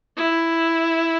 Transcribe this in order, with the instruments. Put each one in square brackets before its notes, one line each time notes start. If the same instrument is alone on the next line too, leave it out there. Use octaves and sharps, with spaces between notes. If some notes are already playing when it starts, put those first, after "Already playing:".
[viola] E4